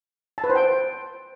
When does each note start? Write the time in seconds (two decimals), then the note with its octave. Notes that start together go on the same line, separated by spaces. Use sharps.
0.38 A5
0.44 B4
0.50 C5
0.55 G5